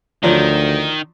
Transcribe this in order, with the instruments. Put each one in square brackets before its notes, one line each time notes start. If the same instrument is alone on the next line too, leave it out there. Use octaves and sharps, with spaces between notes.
[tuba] D2 [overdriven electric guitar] D#3 [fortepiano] F3 F#3 D4